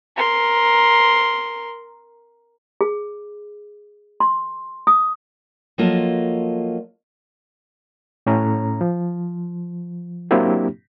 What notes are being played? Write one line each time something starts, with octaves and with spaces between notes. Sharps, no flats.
A#4 C6
G#4
C6
D#6
F3 F#3 A#3 F4 A4 D#5
A2 C#4 A#5
F3
F#3 A#3 C4 D4 E4 G4